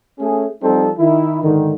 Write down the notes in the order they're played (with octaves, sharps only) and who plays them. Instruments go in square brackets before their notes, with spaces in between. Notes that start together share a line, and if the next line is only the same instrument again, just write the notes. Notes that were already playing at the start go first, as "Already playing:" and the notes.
[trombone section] A3 C#4 G#4
F3 G3 C4 D#4 A4
D#3 E4
G#2 D3 D#3